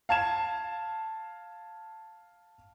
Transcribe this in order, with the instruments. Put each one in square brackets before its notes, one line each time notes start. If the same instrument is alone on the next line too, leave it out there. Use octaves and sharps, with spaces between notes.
[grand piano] F5 A5 G#6 E7